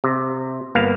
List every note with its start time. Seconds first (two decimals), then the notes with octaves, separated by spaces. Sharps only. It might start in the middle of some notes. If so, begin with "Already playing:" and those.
0.04 C3
0.75 G1 A#3 B3 F5